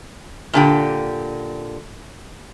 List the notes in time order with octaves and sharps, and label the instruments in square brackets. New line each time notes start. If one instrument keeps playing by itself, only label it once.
[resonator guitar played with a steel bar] A#2 D3 G4